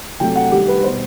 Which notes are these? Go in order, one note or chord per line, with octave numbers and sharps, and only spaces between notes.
C3 F#3 A3 G5
F#5
D#3 G3 G4
B4
B2 G3 C5